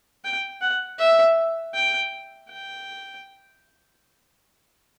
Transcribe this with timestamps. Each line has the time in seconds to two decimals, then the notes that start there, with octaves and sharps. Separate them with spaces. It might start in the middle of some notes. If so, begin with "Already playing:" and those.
0.24 G5
0.62 F#5
0.99 E5
1.74 G5
2.50 G5